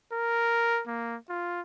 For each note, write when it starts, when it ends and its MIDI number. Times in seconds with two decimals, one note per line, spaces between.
0.13 0.82 70
0.87 1.16 58
1.29 1.61 65